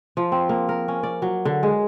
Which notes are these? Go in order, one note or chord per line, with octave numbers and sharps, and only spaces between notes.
F3
C4
A#3
A#4
C#4
D5
F#3
D3
G#3